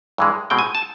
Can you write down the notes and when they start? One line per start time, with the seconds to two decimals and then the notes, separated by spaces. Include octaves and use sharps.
0.18 G2 E3 G#3
0.50 B2 G#3 C4 G5
0.59 G#5
0.75 A5